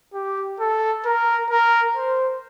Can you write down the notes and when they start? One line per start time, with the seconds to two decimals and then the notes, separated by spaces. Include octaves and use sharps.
0.14 G4
0.60 A4
1.05 A#4
1.50 A#4
1.96 C5